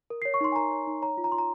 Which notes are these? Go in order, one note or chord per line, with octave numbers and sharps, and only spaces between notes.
A#4
C#5 C7
C#6
D#4 C6
G#5
A#4 A#5
C#5
D#4
C#5 A#5
F4
A#5
F4 C6
A#5